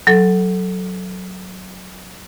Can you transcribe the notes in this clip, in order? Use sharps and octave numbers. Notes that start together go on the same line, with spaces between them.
F#3 A4